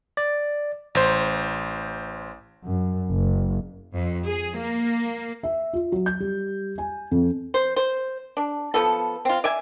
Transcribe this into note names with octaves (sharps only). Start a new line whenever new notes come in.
D5
A1 C5
F#2
F#1
F2
G#4
A#3
E5
F4
F#3
G6
G3
G#5
F2
C5
C5
D4
F3 B3 A4
C4 F4
D5 E5 G#5